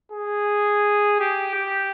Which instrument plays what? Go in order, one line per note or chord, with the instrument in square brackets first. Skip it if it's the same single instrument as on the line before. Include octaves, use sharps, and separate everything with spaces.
[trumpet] G#4
G4
G4